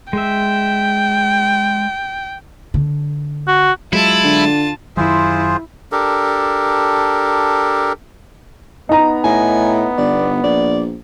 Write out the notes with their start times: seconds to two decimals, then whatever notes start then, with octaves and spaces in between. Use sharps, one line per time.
0.13 G#3 E5 G5
2.74 D3
3.48 F#4
3.93 F#3 G#3 E4 F4 A5
4.24 D3
4.97 F#2 D#3 F#3 E4 F4 G#4 C5
5.92 D4 G4 A4 A#4
8.89 B3 D#4 A#5
9.24 A2 G#5
9.98 G1 D5
10.44 A#1 D5